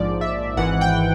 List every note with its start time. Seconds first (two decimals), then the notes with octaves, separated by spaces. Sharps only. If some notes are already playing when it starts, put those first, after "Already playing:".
Already playing: A#1 G#2 F3 D5
0.21 E5
0.57 G#1 G#2 E3 F#5
0.81 G5